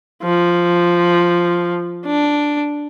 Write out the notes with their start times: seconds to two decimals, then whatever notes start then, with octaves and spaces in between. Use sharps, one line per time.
0.23 F3
2.06 D4